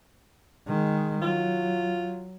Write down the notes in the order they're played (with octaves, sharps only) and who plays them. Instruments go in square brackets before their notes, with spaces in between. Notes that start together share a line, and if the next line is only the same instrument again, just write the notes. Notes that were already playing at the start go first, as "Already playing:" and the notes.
[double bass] D#3 G#3
[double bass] F#3 [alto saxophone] F4